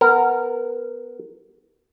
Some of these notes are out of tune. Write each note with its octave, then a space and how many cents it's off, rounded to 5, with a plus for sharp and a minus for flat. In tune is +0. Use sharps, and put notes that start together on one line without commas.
B3 +0 A#4 -15